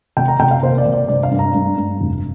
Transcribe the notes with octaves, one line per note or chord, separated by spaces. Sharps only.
C3 G5
A#5
C3 G5
F5
A#3 C5
D5
C3
D5
G2 D5
F5
G2
A#5
G2
G2
F1